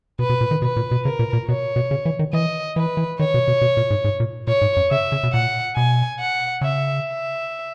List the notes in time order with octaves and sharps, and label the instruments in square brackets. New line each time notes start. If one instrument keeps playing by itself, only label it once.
[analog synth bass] B2 [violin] B4
[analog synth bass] B2
A#2
D#3
[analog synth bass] B2 [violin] B4
[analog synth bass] A#2
B2
[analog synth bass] C#3 [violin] A#4
[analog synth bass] A#2
A#2
[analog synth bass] B2 [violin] C#5
[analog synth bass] B2
C#3
E3
D#3
[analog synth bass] E3 [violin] D#5
[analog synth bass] E3 [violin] B4
[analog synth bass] E3
[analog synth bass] D#3 [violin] C#5
[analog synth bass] B2
B2
B2
A#2
G#2
G#2
A#2
[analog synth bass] A#2 [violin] C#5
[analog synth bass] G#2
F#2
[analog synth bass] C#3 [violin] E5
[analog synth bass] C#3
B2
[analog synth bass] A#2 [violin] F#5
[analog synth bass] B2 [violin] G#5
[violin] F#5
[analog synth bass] C#3 [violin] E5
[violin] E5